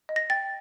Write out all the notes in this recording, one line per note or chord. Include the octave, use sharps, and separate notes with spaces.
D#5
A#6
G5 A6